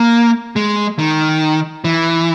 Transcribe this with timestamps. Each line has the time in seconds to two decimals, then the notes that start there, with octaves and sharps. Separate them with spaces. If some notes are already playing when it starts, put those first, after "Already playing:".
Already playing: A#3
0.56 G#3
0.99 D#3
1.84 E3